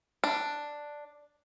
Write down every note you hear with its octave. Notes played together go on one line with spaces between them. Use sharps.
D4